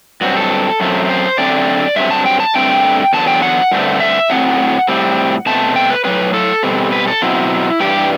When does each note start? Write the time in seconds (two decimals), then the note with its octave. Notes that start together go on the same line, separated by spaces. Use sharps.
0.21 G2 F#3 C4 F#4
0.36 A4
0.80 F#2 F#3 A3 C4
1.09 C5
1.38 F#2 D3 A3 C4 D5
1.96 G2 D3 F#3 C4 E5
2.11 A5
2.26 G5
2.40 A5
2.55 G2 D3 A3 C4 G5
3.13 E2 D3 F#3 B3 A5
3.28 G5
3.42 F#5
3.72 G2 D3 A3 C4
4.00 E5
4.30 A2 F#3 C4 F#5
4.88 A2 G3 C4
5.46 B2 A3 C4 A5
5.76 G5
5.90 B4
6.05 A2 F#3 C4 B4
6.34 A4
6.63 B2 G3 C4
6.92 B4
7.07 A4
7.22 B2 F#3 C4 E4
7.80 G2 E3 G3 G4